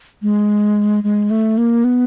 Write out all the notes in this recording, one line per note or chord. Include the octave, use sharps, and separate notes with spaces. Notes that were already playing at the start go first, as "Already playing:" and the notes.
G#3
G#3
A3
A#3
B3